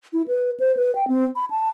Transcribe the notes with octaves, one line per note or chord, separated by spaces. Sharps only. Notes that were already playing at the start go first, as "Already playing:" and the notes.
E4
B4
C5
B4
G5
C4
B5
A5